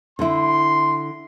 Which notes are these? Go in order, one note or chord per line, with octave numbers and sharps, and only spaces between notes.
D3 E4 C6